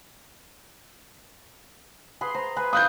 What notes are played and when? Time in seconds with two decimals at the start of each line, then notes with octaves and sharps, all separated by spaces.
2.21 G#4 B4 C6
2.34 C5 A#5
2.57 B4 G#5
2.73 F5 D#6 F#6 G6